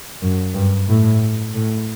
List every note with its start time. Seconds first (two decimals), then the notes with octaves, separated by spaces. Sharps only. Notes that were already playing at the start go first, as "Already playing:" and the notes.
0.22 F#2
0.54 G2
0.88 A2
1.54 A2